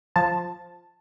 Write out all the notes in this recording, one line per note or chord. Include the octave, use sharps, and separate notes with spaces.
F3 A5